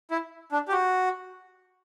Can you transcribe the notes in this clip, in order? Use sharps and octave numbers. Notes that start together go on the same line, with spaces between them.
E4
D4
G4
F#4